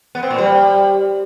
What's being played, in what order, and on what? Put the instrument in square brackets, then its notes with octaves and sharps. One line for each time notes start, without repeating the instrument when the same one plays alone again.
[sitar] B3
C4
A#2
G3